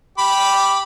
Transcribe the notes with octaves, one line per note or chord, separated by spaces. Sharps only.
G4 B5 D6